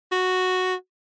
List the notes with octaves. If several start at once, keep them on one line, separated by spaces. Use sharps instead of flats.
F#4